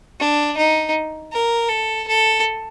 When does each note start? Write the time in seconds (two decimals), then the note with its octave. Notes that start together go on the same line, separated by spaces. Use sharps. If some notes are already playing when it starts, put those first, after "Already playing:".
0.19 D4
0.57 D#4
1.32 A#4
1.69 A4
2.08 A4